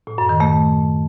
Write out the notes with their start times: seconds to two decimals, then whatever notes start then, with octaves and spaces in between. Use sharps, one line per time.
0.07 A2
0.18 F#2
0.29 D#3
0.40 A3